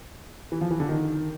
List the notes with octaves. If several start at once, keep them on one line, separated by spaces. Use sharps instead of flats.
E3
F3
E3
D3
D#3